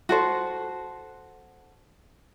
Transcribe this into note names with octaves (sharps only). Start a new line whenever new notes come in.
F#4 A4 C5